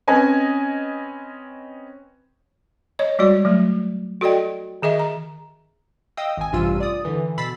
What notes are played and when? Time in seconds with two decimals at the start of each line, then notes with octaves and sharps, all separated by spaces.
0.08 C4 C#4 B4 D#5 G#5
2.99 C#5 D#5
3.19 G3 G#3 F#4 D5
3.45 F#3 A3
4.21 F#4 A4 D5 D#5 G5
4.82 D#3 G#4 D#5 E5
4.99 A#5
6.17 D#5 F5 G5 D#6 E6
6.37 G#1 G#5
6.53 A1 G2 C3 F4 E6 D#7
6.80 D5 D#6
7.05 D3 E3
7.38 B2 B5 E6 A6 B6 C7